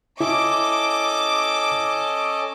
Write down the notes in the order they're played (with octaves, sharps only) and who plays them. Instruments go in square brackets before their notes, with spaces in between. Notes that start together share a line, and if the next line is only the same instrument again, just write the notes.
[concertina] C#4 A4 D#5 [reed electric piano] E4 [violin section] D6